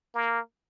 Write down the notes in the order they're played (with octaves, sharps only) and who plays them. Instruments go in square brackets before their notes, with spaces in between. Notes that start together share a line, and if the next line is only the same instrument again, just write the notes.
[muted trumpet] A#3